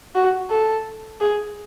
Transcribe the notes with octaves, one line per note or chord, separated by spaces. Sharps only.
F#4
A4
G#4